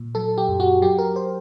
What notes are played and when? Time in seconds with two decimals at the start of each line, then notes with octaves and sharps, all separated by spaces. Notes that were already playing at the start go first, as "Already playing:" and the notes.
Already playing: A#2
0.15 F#3 A4
0.38 G4
0.49 F#2
0.60 F#4
0.82 F#3 G4
0.99 A#4
1.16 C5